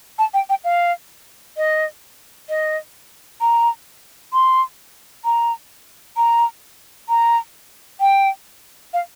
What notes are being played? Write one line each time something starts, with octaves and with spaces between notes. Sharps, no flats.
A5
G5
G5
F5
D#5
D#5
A#5
C6
A#5
A#5
A#5
G5
F5